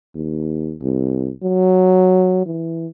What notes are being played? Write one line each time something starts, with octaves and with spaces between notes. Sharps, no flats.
D#2
C2
F#3
E3